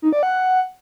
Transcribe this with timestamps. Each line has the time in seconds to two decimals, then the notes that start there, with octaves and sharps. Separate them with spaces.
0.02 D#4
0.13 D5
0.23 F#5